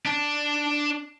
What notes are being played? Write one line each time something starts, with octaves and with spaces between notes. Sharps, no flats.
D4